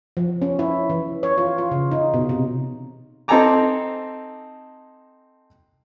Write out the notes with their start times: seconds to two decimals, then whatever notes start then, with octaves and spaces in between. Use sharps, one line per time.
0.17 F3
0.42 C#4
0.59 E4
0.90 E3
1.23 C#5
1.38 F4
1.58 F4
1.71 C#3
1.91 D#4
2.14 B2
2.29 C3
3.28 C4 D#4 A4 G#5 A#5 D6